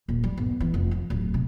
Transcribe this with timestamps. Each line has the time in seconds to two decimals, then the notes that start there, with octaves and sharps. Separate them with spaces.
0.09 D#1
0.24 G3
0.37 G1
0.60 E3
0.74 F1
0.91 F3
1.10 D1
1.34 C3